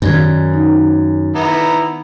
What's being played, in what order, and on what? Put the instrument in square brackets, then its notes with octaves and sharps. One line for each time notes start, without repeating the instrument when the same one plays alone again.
[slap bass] F#2 [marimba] D#3 D5 G#6
[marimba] D#4
[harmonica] B3 E4 A#5